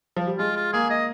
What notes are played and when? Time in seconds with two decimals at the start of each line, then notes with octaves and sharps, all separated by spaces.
0.17 F3
0.27 G3
0.38 G#3 F4
0.56 F4
0.73 A#3 G#4
0.90 D#5